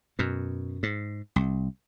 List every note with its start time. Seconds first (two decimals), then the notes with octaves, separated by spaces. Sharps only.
0.19 F#2 B2
0.83 G#2
1.36 C2